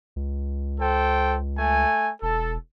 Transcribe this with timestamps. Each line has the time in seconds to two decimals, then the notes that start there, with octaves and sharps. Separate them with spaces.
0.16 C#2
0.81 A4 C5 G5
1.58 A3 G#5
2.22 E1 A4